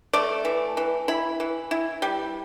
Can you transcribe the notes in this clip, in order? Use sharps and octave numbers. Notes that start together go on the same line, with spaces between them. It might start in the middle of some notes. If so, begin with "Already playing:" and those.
A3 D5
E3
E3
E4 B5
E3
E4
G3